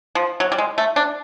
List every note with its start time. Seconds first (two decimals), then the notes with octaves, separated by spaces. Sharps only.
0.15 F3
0.40 F#3
0.52 G3
0.58 G#3
0.78 A3
0.96 D4